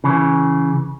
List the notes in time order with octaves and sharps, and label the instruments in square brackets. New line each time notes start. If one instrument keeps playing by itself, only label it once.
[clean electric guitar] C#3 E3